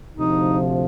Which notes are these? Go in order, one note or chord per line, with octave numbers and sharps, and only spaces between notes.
D2 C3 F3 D#4